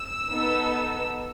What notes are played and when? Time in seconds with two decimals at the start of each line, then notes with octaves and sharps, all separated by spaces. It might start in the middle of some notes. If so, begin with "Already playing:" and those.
Already playing: E6
0.28 B3 D#4 A4